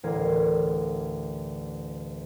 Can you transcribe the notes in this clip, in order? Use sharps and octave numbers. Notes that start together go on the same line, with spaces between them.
A1 D2 A#4 G#6 C7